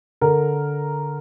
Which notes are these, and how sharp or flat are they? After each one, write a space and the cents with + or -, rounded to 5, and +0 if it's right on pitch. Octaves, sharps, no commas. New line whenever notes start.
D3 -10 A#4 +0